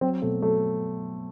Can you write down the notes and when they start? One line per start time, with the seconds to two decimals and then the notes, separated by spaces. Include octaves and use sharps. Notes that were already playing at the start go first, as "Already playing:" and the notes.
0.01 F#3 C4
0.22 B2 A3
0.42 F#3 A3